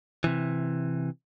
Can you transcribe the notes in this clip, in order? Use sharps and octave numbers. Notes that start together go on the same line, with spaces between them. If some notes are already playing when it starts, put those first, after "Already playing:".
C3 E3